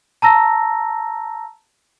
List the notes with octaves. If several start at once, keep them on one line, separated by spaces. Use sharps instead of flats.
A5 A#5 E6 A#6